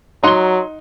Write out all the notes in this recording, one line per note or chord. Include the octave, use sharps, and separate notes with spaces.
F#3 D#4 F#5 C6 G7